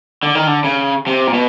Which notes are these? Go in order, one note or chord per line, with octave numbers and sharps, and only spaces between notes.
D3
D#3
D3
C#3
C3
A#2
B2